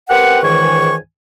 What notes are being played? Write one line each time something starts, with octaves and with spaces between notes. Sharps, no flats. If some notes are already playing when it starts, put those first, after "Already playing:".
C4 G4 A#4 B4 F#5
C#2 G#2 D#3 E3 G#5 C#6